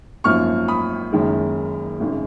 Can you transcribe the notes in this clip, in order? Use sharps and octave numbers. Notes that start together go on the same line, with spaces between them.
G#1 F#2 F3 A#3 C#6 F6
B5 D#6
F#1 F#2 D#3 G#3
G#1 F#2 C#3